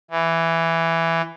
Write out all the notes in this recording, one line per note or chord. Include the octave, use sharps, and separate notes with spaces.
E3